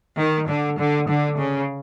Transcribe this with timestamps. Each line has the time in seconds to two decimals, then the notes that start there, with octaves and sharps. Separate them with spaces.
0.18 D#3
0.48 D3
0.78 D3
1.08 D3
1.39 C#3